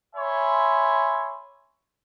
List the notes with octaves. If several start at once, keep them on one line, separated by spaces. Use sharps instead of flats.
C#5 E5 G#5 B5 C6